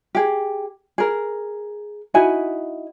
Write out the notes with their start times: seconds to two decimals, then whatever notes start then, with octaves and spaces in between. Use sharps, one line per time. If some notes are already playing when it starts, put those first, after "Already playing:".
0.15 G4 G#4
0.98 G#4 A#4
2.14 D#4 E4 F#4 G#5